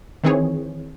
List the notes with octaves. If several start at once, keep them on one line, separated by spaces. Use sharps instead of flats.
D#3 E3 C4 G#4 C#5